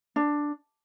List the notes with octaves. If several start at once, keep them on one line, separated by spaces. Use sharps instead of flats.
D4